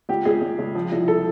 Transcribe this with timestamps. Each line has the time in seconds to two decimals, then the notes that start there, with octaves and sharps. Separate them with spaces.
0.09 C#2 G4
0.25 C#2 G#4
0.41 C#2
0.59 C#2
0.75 F3
0.92 C2
1.08 A4